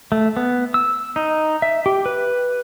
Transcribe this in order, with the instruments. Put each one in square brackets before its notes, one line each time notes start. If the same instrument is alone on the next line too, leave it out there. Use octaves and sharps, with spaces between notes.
[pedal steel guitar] A3
B3
E6
D#4
E5
G4
B4